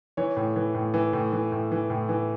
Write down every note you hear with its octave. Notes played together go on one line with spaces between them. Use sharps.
E3 C#5
A2
E3
A2
E3
A2
E3
A2
E3
A2
E3